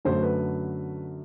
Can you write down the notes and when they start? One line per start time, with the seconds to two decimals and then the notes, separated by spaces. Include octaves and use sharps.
0.05 F#2 D3 F#3 A3 C5
0.22 B4